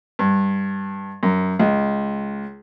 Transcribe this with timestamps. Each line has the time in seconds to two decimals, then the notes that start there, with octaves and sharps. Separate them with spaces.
0.19 G2
1.23 F#2
1.59 C#2